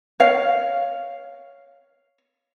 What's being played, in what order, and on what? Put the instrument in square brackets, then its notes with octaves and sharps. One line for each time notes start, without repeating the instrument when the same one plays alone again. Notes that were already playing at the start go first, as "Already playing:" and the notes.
[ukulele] C#5 F5